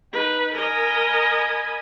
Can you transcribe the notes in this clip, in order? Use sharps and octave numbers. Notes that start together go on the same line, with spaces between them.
D#4 B4
A#4 D#5 G#5 B5 D#6